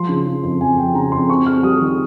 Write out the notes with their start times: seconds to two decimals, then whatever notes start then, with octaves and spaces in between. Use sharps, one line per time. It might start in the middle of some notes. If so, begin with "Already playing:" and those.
Already playing: F3 C6
0.09 C#3
0.26 C#3
0.43 F2
0.61 F2 G#5
0.77 F3 G5
0.95 C#3 A#5
1.12 F2 C6
1.29 C4 C#6
1.46 C4 F6
1.63 G3 D#6
1.81 D#3